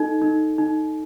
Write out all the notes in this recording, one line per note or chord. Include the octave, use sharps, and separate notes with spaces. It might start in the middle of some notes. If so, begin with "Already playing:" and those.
Already playing: D#4 A4
D#4
D#4